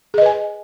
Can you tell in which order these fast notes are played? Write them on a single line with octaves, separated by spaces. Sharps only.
G#4 D#5 B4 G#5